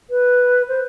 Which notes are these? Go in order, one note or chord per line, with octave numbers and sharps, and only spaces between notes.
B4
C5